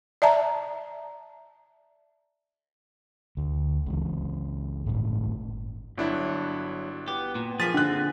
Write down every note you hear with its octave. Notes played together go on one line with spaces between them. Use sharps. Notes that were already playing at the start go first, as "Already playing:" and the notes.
D5 E5 A5 A#5
D2
C#2 E3
G1 A2
G1 F#3 D4 E4
B3 G4
A#2
F3 A#3 G#4 A6 B6
D3 C4 F#6